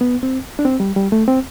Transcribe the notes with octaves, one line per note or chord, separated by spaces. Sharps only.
B3
C4
D4
C4
G3
G3
A3
C4